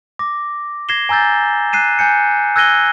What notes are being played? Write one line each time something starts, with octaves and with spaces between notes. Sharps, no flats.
D6 A#6
G#6 A#6 C7 E7 G7
G#5 A#5 E6 G6 A6
F#6 C7 D#7 E7
G#5 G6 C#7
E6 F#6 G#6 A#6 D#7 G7